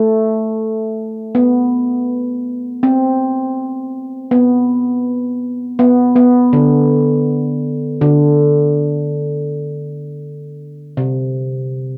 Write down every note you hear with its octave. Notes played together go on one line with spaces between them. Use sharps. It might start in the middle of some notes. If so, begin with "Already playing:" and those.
Already playing: A3
B3
C4
B3
B3
B3
D3
D3
C3